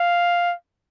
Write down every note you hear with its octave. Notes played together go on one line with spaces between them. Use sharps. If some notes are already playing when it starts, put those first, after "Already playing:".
Already playing: F5